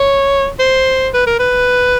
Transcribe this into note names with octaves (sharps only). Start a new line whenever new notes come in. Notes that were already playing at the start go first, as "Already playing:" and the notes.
Already playing: C#5
C5
B4
A#4
B4